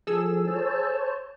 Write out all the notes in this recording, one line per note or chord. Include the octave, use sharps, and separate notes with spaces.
F3 G#4 A4 E6
C5 C#5 A5